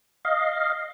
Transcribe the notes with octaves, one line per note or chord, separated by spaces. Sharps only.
D#5 F5